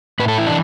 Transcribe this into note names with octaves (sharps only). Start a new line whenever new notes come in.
A2 B4
A4
E3 E4
D4